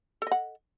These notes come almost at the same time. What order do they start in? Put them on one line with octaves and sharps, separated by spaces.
A4 D#5 F#5